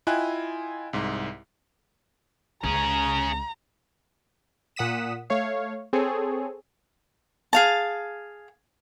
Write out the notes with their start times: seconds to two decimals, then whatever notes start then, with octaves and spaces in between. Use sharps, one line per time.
0.07 E4 F4 D#5 G5 G#5 F#6
0.93 C2 G#2
2.64 C#2 C#4 G#4 A#5
4.76 A#2 F#5 D#6 B6 E7
5.30 A3 C#5 F5
5.93 C4 G#4 A4 C#5
7.53 G#4 F5 A5